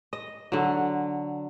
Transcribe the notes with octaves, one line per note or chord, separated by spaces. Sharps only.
D#5
D3 F#3